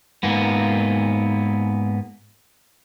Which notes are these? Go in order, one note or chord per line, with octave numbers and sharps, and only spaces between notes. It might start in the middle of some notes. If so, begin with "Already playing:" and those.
G#2 A#3 B3